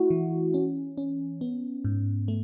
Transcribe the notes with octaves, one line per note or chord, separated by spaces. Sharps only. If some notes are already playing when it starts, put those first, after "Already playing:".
Already playing: A3 E4 F#4
E3
C#4
C#4
B3
G#2
A3